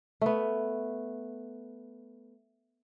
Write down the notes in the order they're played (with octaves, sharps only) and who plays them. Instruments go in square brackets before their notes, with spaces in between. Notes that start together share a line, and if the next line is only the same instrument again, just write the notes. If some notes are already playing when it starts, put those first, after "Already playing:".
[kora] A3 B3